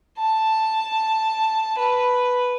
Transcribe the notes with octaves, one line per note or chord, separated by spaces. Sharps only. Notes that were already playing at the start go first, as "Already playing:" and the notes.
A5
B4